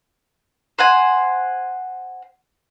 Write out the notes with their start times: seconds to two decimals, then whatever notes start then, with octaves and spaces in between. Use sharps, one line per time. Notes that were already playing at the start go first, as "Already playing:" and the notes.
0.79 C5 F#5 G#5